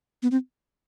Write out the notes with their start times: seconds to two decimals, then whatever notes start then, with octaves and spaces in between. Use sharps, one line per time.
0.23 B3
0.31 C4